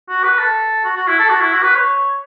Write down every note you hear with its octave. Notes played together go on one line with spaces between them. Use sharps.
F#4
B4
A4
F#4
F#4
E4
A4
F#4
E4
F#4
B4
C#5